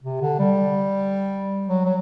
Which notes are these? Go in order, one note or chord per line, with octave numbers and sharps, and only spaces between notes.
C3
D3
G3
F#3
F#3